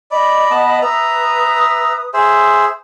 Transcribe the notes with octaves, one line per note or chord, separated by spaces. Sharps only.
D5 D#5 B5
B3 A5
B4 E5 A#5 D#6
G#4 C5 E5